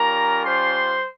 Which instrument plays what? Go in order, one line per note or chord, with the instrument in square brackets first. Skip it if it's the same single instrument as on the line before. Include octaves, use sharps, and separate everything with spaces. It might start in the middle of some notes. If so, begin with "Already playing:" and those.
Already playing: [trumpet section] G3 C#4 F4 A#4 A#5
C5 C6